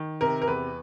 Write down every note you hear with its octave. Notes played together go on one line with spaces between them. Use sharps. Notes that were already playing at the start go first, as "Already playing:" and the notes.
Already playing: D#3
C3 A#4
A#4
E2 B4